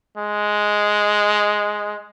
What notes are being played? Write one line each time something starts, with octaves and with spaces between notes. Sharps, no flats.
G#3